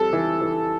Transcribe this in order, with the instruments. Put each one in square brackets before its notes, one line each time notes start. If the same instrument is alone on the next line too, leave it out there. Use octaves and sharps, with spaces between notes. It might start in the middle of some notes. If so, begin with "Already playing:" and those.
Already playing: [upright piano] F2 G3 [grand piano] A4
[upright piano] E3
E3